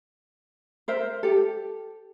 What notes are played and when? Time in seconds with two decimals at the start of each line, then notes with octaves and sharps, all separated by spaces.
0.88 A#4 C5 E5
1.23 G4 A4